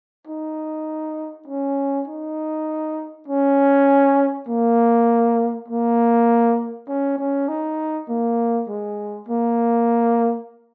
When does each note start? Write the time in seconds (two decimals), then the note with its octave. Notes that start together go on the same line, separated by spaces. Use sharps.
0.27 D#4
1.47 C#4
2.08 D#4
3.28 C#4
4.48 A#3
5.68 A#3
6.88 C#4
7.18 C#4
7.48 D#4
8.09 A#3
8.68 G#3
9.28 A#3